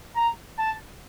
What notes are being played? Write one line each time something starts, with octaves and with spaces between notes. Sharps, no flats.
A#5
A5